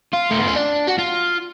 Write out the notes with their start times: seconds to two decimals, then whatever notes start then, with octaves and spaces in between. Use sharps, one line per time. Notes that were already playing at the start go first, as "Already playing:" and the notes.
0.13 F4
0.31 A3
0.38 B3
0.48 C#4
0.56 D4
0.88 F#4
0.99 F4